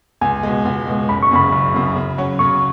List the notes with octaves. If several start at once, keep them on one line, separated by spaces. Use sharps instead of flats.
C#2 G#5
B2 G#3
C#2
B2 G#3
F#1 B5
C#6
F#2 C#3 B5
F#1
F#2 C#3
C#3
F#3 C#4 F#4 C#5
C#3 C#6